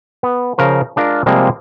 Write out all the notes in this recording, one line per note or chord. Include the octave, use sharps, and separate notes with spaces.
B3
C#3 F3 A#4 C5
G#3 D4 F4 A#4
C3 F3 G3 G#3 A#3 C4